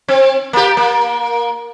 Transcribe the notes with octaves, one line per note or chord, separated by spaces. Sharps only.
C4
A#3 G4
A#3